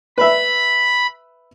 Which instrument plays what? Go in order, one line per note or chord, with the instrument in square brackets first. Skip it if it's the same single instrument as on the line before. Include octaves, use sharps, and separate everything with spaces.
[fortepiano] B4 E5 [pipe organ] B5